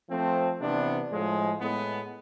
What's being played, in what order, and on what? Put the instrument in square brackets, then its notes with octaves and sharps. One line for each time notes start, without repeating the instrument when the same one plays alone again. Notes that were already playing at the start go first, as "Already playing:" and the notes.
[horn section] F3 A3 C4
C3 E3 B3 D4
A2 F3 G#3
A2 G#3 B3